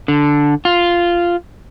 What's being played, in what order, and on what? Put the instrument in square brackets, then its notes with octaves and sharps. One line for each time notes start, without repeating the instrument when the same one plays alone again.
[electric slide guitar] D3
F4